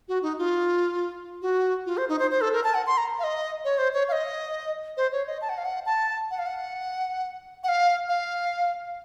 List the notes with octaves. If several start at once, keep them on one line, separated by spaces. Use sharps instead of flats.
F#4
D#4
F4
F#4
F4
C5
D#4
C5
C5
A4
A#4
A5
F#5
C6
A#5
F5
D#5
C#5
C5
C#5
F5
D#5
C5
C#5
D#5
A5
F#5
F5
F#5
A5
F#5
F5
F#5
F#5
F5
F5